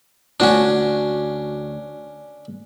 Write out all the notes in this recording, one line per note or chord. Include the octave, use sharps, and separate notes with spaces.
D2 C#4 D4 F#4